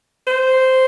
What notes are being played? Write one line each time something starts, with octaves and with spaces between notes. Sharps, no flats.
C5